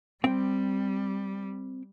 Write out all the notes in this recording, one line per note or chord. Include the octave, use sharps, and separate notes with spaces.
G3 C4 G5